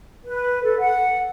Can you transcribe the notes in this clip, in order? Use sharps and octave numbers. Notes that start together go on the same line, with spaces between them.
B4
A4
F#5